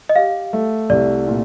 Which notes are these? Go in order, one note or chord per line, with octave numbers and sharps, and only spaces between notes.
D#5
G4 F5
A3
C2 D5
A#2